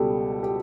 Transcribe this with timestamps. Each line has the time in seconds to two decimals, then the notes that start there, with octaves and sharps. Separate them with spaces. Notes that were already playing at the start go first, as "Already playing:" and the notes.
Already playing: C#2 B2 G3 G4 A4
0.43 G4